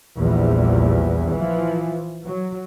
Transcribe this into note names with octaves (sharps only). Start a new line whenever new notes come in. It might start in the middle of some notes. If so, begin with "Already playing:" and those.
A#1 E2 G3
E3 F3
F#3